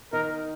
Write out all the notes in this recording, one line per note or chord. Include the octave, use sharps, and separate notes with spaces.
D#3 A#4